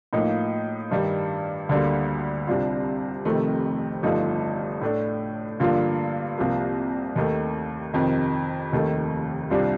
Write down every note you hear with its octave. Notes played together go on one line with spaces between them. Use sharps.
A2 F3 A#3 D#4
G2 D#3 G3
D2 D3 G3 A#3
C2 C3 G3 D4 F4
F1 F2 C3 D#3 A3
G1 G2 F3 A3 D#4
A2 A3 D4
G2 D3 F3 A#3 F4
C2 C3 F3 A#3
D#2 D#3 A3
F2 C3 D#3
F1 D#2 D#3 A3
C2 C3 G3 D4 F4